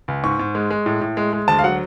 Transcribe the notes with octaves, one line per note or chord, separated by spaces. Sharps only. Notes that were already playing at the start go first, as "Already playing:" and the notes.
C#2
G#2 C#6
G#2
G#3
G#3
A2
A2
G#3
G#3
D2 A5
F5
F#3 F#5